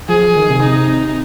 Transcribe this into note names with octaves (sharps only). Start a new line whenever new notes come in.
F3 G#4
D#3
C3
D#4